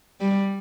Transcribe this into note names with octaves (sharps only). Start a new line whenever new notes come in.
G3